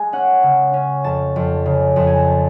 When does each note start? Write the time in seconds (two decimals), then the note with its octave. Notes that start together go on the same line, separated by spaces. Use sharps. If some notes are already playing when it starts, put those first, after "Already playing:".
Already playing: G#3 G#5
0.13 C#4 F#5
0.43 C#3
0.74 C#4
1.04 F2 A5
1.36 F2
1.66 C#3
1.96 F2 A5
2.07 G#5
2.16 A5